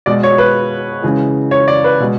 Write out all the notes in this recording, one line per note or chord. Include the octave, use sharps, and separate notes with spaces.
B2 G#3 D5
C#5
B4
C#3 E3 G#3
C#5
D5
B4
B2 G#3